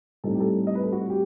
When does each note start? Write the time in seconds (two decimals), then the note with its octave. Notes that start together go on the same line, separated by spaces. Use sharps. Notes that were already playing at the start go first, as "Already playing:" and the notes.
0.24 A2 G3 C4 D#4 A4
0.35 G4
0.40 A4
0.67 D#5
0.75 B4
0.83 A4
0.92 F#4
1.10 G4